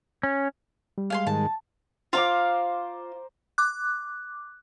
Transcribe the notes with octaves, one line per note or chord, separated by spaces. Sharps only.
C#4
G3
G#3 F5 G#5 C6
G#2 D#3 G#3 A5
F4 C5 F5 A#5 D6
D6 F#6